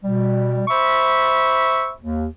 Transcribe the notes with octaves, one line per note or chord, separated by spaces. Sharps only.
B2 G3
C5 E5 B5 C#6
D#2